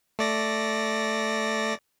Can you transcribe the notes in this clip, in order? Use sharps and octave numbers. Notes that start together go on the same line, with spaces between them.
A3 D5 A#6